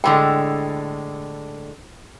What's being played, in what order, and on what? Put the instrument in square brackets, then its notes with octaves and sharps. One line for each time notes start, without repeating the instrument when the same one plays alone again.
[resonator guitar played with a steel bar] A2 D3 G#3 [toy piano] G5